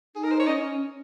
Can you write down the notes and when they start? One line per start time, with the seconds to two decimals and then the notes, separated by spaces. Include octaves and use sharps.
0.16 D#4 G#4
0.24 A#4
0.31 C5
0.40 C#5
0.47 C#4 D#5